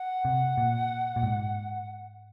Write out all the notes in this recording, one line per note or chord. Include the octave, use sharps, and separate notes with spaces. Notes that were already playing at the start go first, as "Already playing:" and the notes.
Already playing: F#5
C3
A#2
A#2
G#2